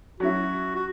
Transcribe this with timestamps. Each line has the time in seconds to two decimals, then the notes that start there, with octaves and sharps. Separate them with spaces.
0.20 F#3 C#4 E4 F#4
0.76 F#4